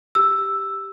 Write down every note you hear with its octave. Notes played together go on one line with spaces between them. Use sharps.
G4 E6